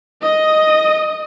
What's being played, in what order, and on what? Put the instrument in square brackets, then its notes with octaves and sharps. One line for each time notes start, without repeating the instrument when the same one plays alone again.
[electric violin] D#5 D#6